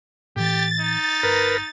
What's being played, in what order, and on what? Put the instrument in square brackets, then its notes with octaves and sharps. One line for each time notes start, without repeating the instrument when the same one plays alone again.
[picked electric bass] A2 E3 [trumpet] G4 [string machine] A6
[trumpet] D#4
[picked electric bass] G1 [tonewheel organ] A#4 B4